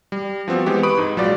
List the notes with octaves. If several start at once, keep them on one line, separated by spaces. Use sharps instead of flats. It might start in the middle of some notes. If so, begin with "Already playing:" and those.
G3
F3 B3 C4 F#4
E3 G#3 B3 G4 C5
B4 B5 C#6 D#6 D7
G#2 D#4
A#1 F#3 G#3 F4 D5